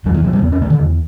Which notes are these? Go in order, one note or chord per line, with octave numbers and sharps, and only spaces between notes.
E2 F#3
E3
C#3 F#3
G3
E2 B3
C#4
C#3 A3
D3
E2